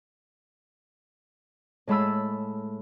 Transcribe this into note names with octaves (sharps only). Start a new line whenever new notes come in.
A2 G#3 A5 B5 E6